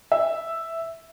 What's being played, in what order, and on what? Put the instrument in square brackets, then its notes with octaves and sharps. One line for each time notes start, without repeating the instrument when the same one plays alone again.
[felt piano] E5